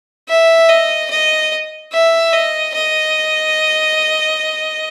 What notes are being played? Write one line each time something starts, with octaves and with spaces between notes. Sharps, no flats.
E5
D#5
D#5
E5
D#5
D#5